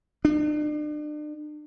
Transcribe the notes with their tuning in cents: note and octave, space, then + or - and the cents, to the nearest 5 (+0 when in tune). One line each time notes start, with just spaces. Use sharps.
D4 +40